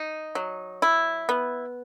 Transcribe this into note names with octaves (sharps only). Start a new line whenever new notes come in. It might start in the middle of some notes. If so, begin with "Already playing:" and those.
Already playing: D#4
F#3
E4
B3